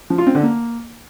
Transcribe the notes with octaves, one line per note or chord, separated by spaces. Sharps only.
F3
F4
C4
D3
A#3